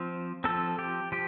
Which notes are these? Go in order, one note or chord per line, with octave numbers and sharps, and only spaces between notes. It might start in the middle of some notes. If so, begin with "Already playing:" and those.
Already playing: F3 C4
F3 C4 A4
G4
F3 G4